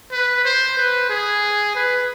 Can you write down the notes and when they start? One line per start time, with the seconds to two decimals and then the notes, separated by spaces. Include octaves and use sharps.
0.12 B4
0.45 C5
0.78 B4
1.10 G#4
1.75 B4